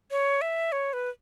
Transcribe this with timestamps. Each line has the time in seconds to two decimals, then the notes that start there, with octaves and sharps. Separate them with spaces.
0.11 C#5
0.41 E5
0.72 C#5
0.93 B4